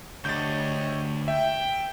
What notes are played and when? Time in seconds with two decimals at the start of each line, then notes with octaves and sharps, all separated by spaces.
0.25 D2 G4 C#5 D#5 G6 A6
1.28 E5 G5